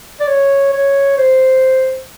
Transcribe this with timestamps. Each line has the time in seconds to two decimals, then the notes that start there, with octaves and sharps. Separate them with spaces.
0.20 D5
0.28 C#5
0.73 C#5
1.17 C5